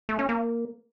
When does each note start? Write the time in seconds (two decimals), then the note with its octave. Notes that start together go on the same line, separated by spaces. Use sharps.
0.09 A3
0.19 C#4
0.29 A#3